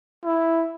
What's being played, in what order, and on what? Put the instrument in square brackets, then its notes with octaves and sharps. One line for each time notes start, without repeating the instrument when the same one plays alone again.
[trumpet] E4